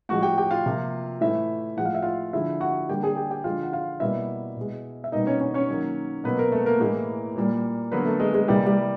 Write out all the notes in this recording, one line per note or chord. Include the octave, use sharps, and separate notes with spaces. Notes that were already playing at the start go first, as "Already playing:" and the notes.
A2 F3 G#3 F#4 F#5
G4 G5
G4 G5
F4 F5
C3 F3 A#3
A2 E3 A3 E4 E5
A2 F3 G#3 F#5
F5
E5
F4 F5
D3 F3 G#3 E4 E5
F#4 F#5
D3 G3 A#3 G4 G5
G#4 G#5
G4 G5
G4 G5
D3 F3 G#3 F4 F5
F#5
F4 F5
B2 G3 A#3 E4 E5
B2 G#3
E5
B2 G3 A#3 D#4 D#5
C#4 C#5
C#4 C#5
C#4 C#5
D#3 F#3 A#3
B2 F#3 A#3 B3 B4
A#3 A#4
A3 A4
A#3 A#4
A2 E3 G#3 A#3 A#4
A#2 G3 A#3
D3 F#3 A#3 B3 B4
A3 A4
G#3 G#4
G#3 G#4
C3 E3 G3 A#3 G4
G3 G4